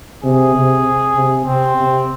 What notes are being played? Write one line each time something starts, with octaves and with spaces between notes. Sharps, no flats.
C3 G#4
C3
C3
C3 C4
C3